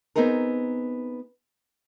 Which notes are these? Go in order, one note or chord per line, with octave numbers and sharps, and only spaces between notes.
B3 C4 D#4 G#4 A#4